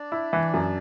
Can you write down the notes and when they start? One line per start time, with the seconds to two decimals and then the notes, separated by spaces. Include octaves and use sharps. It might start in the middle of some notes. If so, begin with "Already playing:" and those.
Already playing: D4 D5
0.12 E4
0.33 E3
0.54 F#2